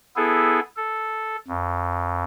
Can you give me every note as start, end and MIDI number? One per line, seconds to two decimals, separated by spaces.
0.16 0.60 59
0.16 0.60 64
0.16 0.60 68
0.16 0.60 69
0.76 1.36 69
1.48 2.24 41